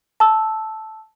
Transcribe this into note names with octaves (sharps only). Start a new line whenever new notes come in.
A5 E6